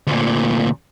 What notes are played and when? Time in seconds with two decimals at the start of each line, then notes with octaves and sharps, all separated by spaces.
0.07 D2 A#2